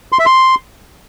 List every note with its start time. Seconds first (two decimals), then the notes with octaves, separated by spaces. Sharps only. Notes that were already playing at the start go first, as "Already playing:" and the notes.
0.12 C6
0.19 E5
0.26 C6